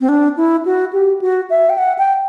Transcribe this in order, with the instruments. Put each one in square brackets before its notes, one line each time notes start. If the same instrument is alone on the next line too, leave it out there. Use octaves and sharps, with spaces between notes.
[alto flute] C4
D4
E4
F#4
G4
F#4
E5
G5
F#5
G5